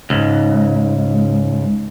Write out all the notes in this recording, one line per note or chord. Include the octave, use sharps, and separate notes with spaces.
C#2 G#2